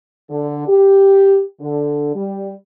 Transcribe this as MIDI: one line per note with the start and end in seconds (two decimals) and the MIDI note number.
0.30 0.66 50
0.67 1.42 67
1.59 2.13 50
2.15 2.51 55